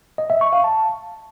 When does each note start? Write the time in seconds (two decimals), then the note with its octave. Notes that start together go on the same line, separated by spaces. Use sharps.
0.18 D#5
0.30 E5
0.41 C#6
0.53 F5
0.64 A5